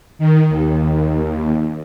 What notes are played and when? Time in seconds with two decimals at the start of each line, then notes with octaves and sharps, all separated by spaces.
0.19 D#3
0.50 D#2